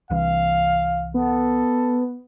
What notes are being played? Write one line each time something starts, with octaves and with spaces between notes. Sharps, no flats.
C2 E3 F5
B3 A4